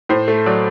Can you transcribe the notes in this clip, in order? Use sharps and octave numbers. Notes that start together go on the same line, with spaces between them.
A2 C5
A3
F#3 D5